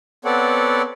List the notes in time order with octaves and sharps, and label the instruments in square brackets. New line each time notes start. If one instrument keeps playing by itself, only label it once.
[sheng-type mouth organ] B3 C4 A4 C#5 D5 F#5